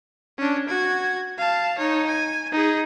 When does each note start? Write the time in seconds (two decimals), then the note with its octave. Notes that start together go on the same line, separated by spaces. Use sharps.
0.38 C#4 D4
0.69 F#4 G#6
1.38 F5 A5
1.78 D#4 C#5
2.07 G#5
2.52 D#4 G#4